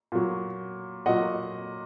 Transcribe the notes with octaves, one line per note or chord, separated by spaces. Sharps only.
A#2 F#3
A#2 F#3 D#5 F#5